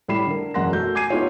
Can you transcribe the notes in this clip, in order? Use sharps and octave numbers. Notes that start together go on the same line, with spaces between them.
A2 G3 B5 C7 E7
D3 A#4
E1 F#2 A#3 F#5 C6 A#6
A3 F#4 G6
G#5 D6 G#6 C7 D#7
A3 B3 D#4 F4 G4 C#5